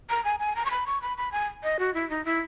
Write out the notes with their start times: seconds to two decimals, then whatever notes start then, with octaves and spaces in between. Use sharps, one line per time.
0.10 A#5
0.25 G#5
0.40 G#5
0.56 A#5
0.66 C#6
0.71 B5
0.87 C#6
1.02 B5
1.18 B5
1.32 G#5
1.63 D#5
1.79 F#4
1.94 E4
2.10 D#4
2.25 E4